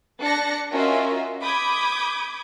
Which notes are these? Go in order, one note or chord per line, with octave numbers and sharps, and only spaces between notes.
D4 F#6 A6 A#6 C#7
C#4 F4 F#4 A#4 D#5 E5
B5 D6 D#6 G6 G#6